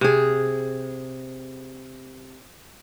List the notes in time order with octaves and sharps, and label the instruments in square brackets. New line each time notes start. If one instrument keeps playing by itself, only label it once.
[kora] C3 G#4